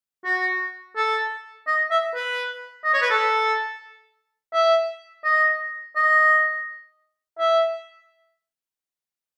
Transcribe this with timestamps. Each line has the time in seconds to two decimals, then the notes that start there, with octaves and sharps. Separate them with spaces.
0.24 F#4
0.96 A4
1.67 D#5
1.91 E5
2.15 B4
2.84 D#5
2.93 C#5
3.02 B4
3.10 A4
4.53 E5
5.24 D#5
5.96 D#5
7.39 E5